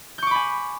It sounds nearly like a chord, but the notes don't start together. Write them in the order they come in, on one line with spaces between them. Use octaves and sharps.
G6 C#6 D6 B5 G#5